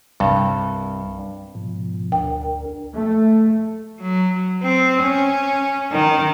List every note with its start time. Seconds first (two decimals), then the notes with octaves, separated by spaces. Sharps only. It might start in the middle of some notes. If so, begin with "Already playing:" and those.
0.20 C2 G2
1.55 G#2 B2 F3
2.12 D2 D4 A#4 G5
2.94 A3
4.01 F#3
4.63 C4
5.02 C#4
5.92 D#3